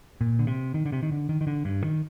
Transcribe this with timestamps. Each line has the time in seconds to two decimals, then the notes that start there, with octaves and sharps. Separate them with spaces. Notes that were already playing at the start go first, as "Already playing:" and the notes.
0.21 A#2
0.39 D3
0.47 C3
0.74 D#3
0.85 D3
0.92 C3
1.03 D#3
1.12 D3
1.29 D#3
1.41 D#3
1.47 D3
1.65 G2
1.84 D#3